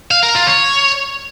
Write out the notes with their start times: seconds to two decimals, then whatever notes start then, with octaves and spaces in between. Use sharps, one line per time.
0.11 F5
0.23 A#4
0.35 F4
0.47 C#5